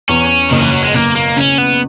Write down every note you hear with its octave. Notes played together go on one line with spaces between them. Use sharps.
E2 C#4
F#1 D#3
E3
F#3
G#3
F#1 A#3
A#3
C#3 C#4
B3